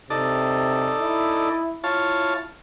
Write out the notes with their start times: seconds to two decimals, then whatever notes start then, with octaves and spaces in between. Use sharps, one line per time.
0.10 C3 D#4 A4 D5
1.01 E4
1.84 E4 F4 C#5 A5